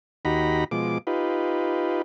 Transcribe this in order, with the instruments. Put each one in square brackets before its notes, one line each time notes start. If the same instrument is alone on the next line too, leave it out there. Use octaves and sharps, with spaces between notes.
[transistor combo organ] D#2 D#4 F#4 G4 A#5 B5
B2 F3 G#3 D6
D#4 F4 G4 B4